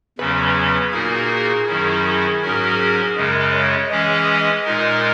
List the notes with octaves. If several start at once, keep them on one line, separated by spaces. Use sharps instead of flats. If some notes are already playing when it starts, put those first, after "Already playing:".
E2 C#3 F#3 C#4 B4
A#2 A#3 D#4 F#4 G#4 A#4
F#2 D#3 F#3 C#4 E4
G#2 F#3 C#4 F#4 A#4
F#2 C#3 G#3 A#4
C#5
E3 G#3 C#4 G#4 D#5
A#2 G#3 D#4 A#4